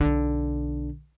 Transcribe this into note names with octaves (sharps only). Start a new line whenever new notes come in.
B1 D3